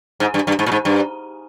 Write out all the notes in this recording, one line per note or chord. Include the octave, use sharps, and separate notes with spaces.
G#2
G2
G2
G#2
A#2
G#2
G2